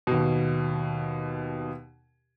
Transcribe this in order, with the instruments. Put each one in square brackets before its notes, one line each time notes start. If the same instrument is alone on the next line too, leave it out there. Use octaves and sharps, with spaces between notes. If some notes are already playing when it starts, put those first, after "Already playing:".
[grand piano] D#2 B2